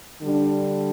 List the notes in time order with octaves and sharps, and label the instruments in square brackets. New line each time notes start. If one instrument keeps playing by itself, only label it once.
[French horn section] D3 G3 D4